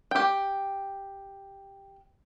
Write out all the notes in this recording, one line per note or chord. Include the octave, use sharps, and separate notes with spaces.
G4 G5